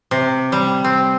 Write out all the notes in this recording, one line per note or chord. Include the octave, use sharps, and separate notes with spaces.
C3
G3
C4